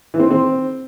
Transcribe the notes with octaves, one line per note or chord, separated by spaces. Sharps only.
E3
C4
D#3
C4